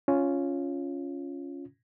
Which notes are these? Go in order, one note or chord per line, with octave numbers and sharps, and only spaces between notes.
C#4 F4